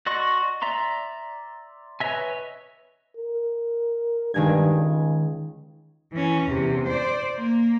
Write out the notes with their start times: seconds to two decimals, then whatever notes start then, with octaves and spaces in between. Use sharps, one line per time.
0.06 F#4 D5 D#5 C6 C#6
0.62 D5 E5 A#5 C6
2.00 B4 C#5 D#5 E5 G#5
3.17 A#4
4.34 G2 D#3 G#3 G#6
4.75 C#2
6.12 E3 C#4
6.46 E2 C3
6.87 C5 D5
7.36 A#3